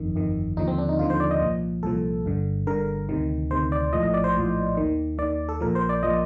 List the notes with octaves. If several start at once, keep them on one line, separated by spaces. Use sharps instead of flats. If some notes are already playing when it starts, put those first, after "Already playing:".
Already playing: G1 F2 D#3
G1 F2 D#3
D#2 D3 F3 D#4
C4
D4
D#4
D#2 D3 F3 F4
C5
D5
D#5
C2 A#2 F3
C2 A#2 F3 A4
G1 G2 D3
G1 G2 D3 A#4
D2 C3 D#3
D2 C3 D#3 C5
D5
A#1 A2 F3 D#5
D#5
D5
C5
A#1 A2 F3
D#2 D#3
D#2 D#3 D5
A4
A#1 A#2 F3 A#4
C5
D5
A#2 F3 D#5